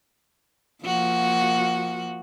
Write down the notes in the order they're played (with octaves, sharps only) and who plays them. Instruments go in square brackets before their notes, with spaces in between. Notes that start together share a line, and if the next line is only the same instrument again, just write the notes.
[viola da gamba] F3 A#3 F#4